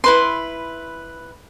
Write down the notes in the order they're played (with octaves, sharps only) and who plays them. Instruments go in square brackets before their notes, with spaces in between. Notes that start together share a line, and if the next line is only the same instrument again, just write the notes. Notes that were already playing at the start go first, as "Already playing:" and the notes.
[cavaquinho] E4 B4 C6